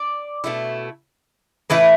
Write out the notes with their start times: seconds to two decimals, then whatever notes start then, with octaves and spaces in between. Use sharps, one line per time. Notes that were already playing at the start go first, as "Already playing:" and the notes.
Already playing: D5
0.44 B2 A3 E4
1.70 A2 E3 A3 E4 B4